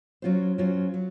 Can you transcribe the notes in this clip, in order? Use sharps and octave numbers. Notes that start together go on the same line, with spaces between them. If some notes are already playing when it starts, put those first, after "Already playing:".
F#3 C#4 F4 C5
F#3 C#4 F4 C5
F#3